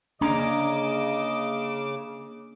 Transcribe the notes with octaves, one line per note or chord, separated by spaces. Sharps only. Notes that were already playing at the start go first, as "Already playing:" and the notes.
C#3 A#3 C#4 D4 D#5 A#5 D6